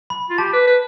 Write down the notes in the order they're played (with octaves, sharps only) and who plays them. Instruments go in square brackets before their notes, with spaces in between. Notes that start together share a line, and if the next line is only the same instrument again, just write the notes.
[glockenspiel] B5
[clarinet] F4
[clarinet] G4 [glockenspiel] A5
[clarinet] B4
B4